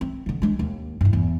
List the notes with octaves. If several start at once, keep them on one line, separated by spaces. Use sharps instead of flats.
C4
D3 E3
G#3 D4
D#2
G2 E4
E2